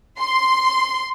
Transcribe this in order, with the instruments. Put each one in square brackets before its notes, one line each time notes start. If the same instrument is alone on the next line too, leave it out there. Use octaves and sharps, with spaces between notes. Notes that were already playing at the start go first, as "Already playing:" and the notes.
[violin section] C6